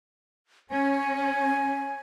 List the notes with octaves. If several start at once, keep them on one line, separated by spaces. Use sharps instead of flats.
C#4 G#5